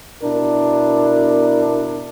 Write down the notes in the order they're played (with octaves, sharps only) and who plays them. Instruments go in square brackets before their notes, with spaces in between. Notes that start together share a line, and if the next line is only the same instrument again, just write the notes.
[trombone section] B2 D4 E4 A#4